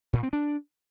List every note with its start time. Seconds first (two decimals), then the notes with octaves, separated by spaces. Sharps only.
0.13 A#2
0.23 C4
0.33 D4